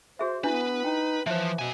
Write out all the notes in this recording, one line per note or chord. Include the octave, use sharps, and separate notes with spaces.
F#4 G#4 C5 E5
B3 D4 E4 B4
D#4 G5
E3 F3 C5 C#5 E5
B2 F#4 G#5